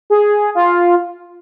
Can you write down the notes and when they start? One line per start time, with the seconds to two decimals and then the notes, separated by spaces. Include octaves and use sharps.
0.10 G#4
0.55 F4